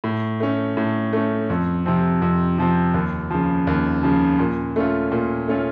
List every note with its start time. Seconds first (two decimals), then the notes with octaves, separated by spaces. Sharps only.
0.04 A2
0.40 A3 C#4
0.77 A2
1.13 A3 C#4
1.50 F2
1.86 C3 F3 C4
2.22 F2
2.58 C3 F3 C4
2.94 D#2
3.30 C#3 F3
3.67 D#2
4.03 C#3 F3
4.39 A#2
4.76 A3 C#4 F4
5.12 A#2
5.48 A3 C#4 F4